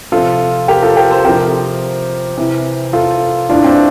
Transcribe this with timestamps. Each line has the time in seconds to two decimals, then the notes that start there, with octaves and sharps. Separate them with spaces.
0.12 C3 F3 F4 A4
0.68 G4 A#4
0.82 F4 A4
0.97 G4 A#4
1.11 A4 C5
1.25 C3 F3 G4 A#4
2.37 C3 E3
2.93 F4 A4
3.50 A2 E3 D4 F4
3.64 C4
3.69 D4